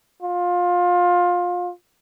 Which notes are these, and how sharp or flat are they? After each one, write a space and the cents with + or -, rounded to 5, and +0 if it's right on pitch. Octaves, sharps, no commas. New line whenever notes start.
F4 +20